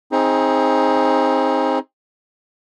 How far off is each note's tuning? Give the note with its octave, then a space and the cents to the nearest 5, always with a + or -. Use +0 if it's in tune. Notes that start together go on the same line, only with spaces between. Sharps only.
C4 +20 D#4 +20 G#4 +0